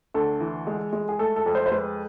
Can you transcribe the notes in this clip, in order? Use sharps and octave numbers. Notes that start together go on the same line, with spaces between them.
D2 A4
E3
G#3
G#3
G#4
A3 A4
A4
F2
C5
C5
G#3 B4